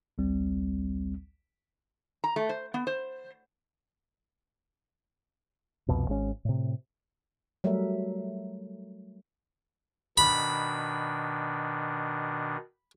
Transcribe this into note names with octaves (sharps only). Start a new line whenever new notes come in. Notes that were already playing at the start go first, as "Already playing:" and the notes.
A1 D2 G3 C4
A#5
A3
C5
B3
C5
C2 F2 B2
G#1 G#3 C#4
A2 C3
F#3 G3 A3 A#4 E5
B2 D#3 D4 B5